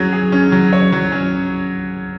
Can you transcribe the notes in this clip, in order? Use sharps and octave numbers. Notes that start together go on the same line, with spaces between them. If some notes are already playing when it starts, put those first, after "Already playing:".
Already playing: F#3 C#4 G#4
G#4
C#4
F#3
C#5
F#3
C#4